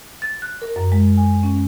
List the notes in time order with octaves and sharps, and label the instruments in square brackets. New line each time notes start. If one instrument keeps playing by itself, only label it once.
[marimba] A6
F#6
A#4
F#2
G#3
G#5
C#4